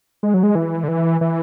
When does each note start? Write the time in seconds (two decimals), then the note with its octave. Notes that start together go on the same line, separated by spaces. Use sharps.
0.23 G#3
0.34 F#3
0.43 G#3
0.55 E3
0.83 D3
0.88 E3
1.21 E3